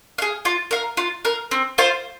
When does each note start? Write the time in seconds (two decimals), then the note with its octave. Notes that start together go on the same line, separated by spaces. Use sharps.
0.18 G#4 F5
0.45 F4
0.71 A#4 F5
0.97 F4
1.25 A#4 F5
1.51 C4
1.78 F4 C5 F5